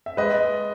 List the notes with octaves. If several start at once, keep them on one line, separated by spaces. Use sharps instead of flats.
E5
G#3 B4 D#5